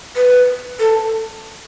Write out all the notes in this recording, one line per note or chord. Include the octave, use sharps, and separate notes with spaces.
B4
A4